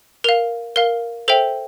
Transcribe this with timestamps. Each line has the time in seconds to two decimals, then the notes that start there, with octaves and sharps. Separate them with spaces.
0.24 A#4 F5 F7
0.76 A#4 F5 G7
1.28 A4 C5 E5 G5 F7